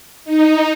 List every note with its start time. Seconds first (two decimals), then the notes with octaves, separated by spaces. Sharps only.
0.25 D#4